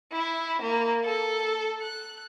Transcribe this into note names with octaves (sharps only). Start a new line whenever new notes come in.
E4
A#3
A4
F#6